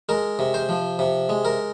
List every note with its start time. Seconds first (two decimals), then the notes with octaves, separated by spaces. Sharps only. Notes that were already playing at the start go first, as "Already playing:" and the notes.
0.09 G#3 A#4
0.39 C3
0.54 C5
0.69 F3
0.99 C3
1.29 G#3
1.45 A#4